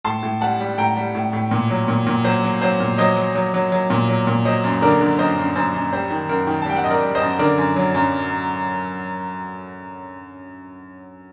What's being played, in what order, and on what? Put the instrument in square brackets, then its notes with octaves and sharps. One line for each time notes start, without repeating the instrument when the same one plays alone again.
[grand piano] A2 A5 C6
A2
G3 F#5 A5
G3
A2 G5 A#5
G3
A2
A2
A#2
F#3
A#2
A#2
F#3 C5
F#3
F#3 C5
A#2
F#3 C5 D#5
F#3
F#3
F#3
F#3
A#2
F#3
A#2
F#3 C5 D#5
F#2
D3 A#4 D5
D3
F#2 C5 D#5
F#2
F#2 C5
F#2
G3 C5
D#3
F#2 A#4
D#3
A5
G3 G5
F#5
F#2 D#5
A#4 D5
G3
C5 D#5
F#2
D3 A#4 D5
F#2
F#3
F#2